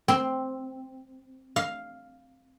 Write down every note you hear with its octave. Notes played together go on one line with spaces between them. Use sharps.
C4
F5